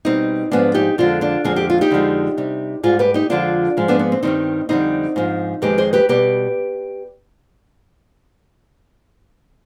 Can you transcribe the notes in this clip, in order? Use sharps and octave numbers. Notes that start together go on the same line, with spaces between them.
B2 G3 C4 D#4
G#2 F3 G#3 B3 D4
D#4 G4
F2 D3 G#3 D4 F4
D4 F4
F2 D3 F3 G#3 G#4
G4
F4
D#4 G4
F2 D3 F3 G#3
C3 G3
G#2 G3 F4 G#4
G4 B4
D#4 G4
F2 D3 F3 G#3 D4 F4
G#2 F3 G#3
B3 D4
B3
C4
G2 D#3 G3 C4 D#4
F2 D3 G3 C4 D#4
G#2 F3 G#3
F2 D#3 G#3 G4 B4
G#4 C5
G4 B4
B2 G3 G4 B4